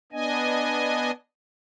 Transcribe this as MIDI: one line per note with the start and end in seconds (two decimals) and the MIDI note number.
0.12 1.11 59
0.12 1.11 62
0.12 1.11 75
0.12 1.11 80